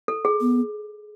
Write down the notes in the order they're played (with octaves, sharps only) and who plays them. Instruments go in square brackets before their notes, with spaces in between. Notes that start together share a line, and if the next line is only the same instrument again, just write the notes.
[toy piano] A4
G#4
[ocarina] B3